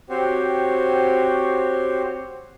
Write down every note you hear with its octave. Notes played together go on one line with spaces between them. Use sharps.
C4 F#4 G4 C5 C#5